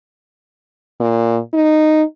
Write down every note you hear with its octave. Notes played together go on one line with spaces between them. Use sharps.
A#2
D#4